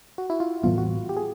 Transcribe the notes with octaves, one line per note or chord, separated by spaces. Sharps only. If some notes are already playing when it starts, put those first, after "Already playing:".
F#4
E4
F4
A2 E3 G3 B3 F4
F#4
G4
G#4